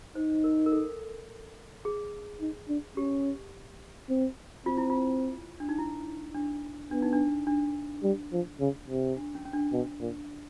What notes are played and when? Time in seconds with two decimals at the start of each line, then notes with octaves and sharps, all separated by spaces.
0.15 D#4 C5
0.44 A#4
0.66 A#4
0.72 A4
1.85 G#4
2.41 D#4
2.69 D4
2.97 C#4 G4
4.09 C4
4.66 C4 F4
4.77 E4
4.90 F4
5.60 D4
5.69 D#4
5.78 E4
6.35 D4
6.91 B3 D4
7.02 D#4
7.13 D4
7.47 D4
8.03 G3
8.32 F3
8.60 C#3
8.88 C3
9.16 D4
9.35 C#4
9.45 C#4
9.53 D4
9.72 B2
10.00 A#2